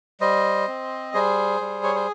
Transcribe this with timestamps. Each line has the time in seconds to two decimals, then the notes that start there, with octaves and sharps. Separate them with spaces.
0.20 G3 C5 D#5
0.68 C4
1.14 G3 G#4 C5
1.61 G3
1.83 C#5
1.95 C5